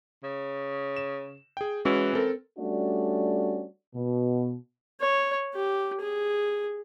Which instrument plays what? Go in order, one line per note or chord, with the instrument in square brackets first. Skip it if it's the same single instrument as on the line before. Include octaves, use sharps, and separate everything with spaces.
[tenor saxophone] C#3
[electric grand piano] E7
G#4 G5
[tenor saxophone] E3 [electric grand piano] G#3 C#4 F#4
[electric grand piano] C4 A4 A#4
[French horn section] G3 A3 C#4 D4 F#4 D5
B2
[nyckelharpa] C#5
G4
G#4